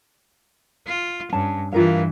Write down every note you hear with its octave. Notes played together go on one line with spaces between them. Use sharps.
F4
G2 C#4 A5
G2 E3 F4 A#4 F5